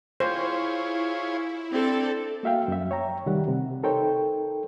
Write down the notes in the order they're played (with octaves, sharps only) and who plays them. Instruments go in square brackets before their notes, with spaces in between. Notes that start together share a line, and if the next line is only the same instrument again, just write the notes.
[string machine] E4 [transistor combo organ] F4 G#4 C#5 [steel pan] C5
[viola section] C4 A4 [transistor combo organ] D4
[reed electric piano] A#3 F#4 E5 F5 G5
F#2 E5
C#5 G5 A#5
C2 D#3 G3 G4 F#5
C3
D#4 A4 A#4 C5 C#5 G5